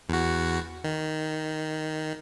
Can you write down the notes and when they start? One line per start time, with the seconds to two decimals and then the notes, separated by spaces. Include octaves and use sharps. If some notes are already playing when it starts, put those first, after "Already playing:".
0.09 E2 F#4
0.84 D#3